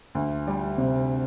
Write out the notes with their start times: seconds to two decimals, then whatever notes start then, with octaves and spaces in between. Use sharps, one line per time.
0.15 D2
0.47 G3
0.78 C3